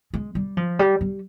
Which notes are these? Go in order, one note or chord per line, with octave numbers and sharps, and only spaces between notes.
G#3
G3
F3
G3
G3